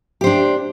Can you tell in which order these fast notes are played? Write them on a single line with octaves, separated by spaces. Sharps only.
G4 C5 D4